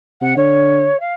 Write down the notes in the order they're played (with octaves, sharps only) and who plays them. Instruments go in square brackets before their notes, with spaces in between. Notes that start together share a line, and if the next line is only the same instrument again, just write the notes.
[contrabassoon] C3 [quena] F#5
[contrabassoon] D3 [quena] C#5
[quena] F5